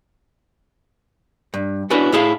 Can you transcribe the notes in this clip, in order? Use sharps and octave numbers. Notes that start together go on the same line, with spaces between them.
G2
B3 C#4 D4 E4 F#4 B4
A2 E4 G#4 F5 A5